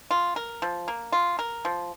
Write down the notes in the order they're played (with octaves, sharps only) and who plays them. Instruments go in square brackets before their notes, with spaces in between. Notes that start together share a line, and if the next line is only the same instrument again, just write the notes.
[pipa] F4
A#4
F3
A#3
F4
A#4
F3